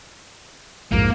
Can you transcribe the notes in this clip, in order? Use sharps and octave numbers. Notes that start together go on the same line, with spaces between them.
A#1 F2 G#2 A#3